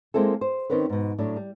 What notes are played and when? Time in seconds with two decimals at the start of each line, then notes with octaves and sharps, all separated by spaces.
0.14 G#3 A#3 C4 E4 A4
0.41 C5
0.70 D#3 C4 C#4 A#4 B4
0.89 G#2 B2
1.18 A2 F#3 D4
1.36 G3